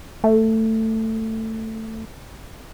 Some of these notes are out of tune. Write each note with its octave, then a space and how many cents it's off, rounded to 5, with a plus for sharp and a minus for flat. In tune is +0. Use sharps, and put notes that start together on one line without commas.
A3 +15